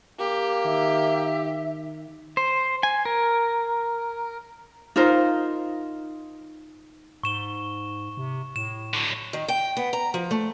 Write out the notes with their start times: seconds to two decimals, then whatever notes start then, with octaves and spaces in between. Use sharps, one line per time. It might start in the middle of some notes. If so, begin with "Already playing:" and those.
0.19 A#3 G4
0.65 D#3 E5
2.37 C5
2.83 G#5
3.05 A#4
4.96 D#4 F4 A#4 C5
7.23 G#2 C#6 E7 G7
8.17 C3
8.56 A2 E7
8.94 D3 F#3
9.33 D#3
9.48 G5
9.77 B3
9.93 A#5
10.14 F3
10.31 A3